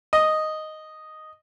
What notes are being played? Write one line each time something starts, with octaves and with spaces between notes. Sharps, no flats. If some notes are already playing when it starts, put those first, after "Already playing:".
D#5